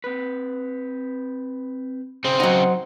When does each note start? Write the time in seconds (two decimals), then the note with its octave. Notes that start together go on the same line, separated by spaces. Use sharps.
0.04 C4 B4
2.24 C#3 C4 G#4 C5
2.40 F#3 D#4 F#5